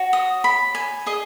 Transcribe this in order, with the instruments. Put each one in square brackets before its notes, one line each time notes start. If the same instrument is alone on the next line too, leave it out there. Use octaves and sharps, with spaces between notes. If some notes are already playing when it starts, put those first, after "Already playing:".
Already playing: [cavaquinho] F#4 C#5
D#6
B5
G#5
G#4 D#5